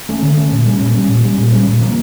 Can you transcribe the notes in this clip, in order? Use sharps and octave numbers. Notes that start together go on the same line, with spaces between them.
A3 C#4
D3
A3 C#4
A#2
G3 C#4
A#2
G3 C#4
A#2
G3 C#4
A#2
G3 C#4
A#2
F3 A#3